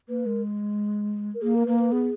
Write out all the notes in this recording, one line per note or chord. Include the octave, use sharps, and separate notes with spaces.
A#3 B4
G#3 A#4
A#4
A#3 G#4
A#4
A#3 B4
B4
B3 G#4